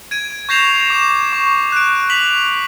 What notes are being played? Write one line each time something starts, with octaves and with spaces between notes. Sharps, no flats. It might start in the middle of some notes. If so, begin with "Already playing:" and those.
G#6 D7 D#7
C#6 G6 A#6 C7 E7 F7
D6 E7
C#6
F#6 D7
B6 F7 F#7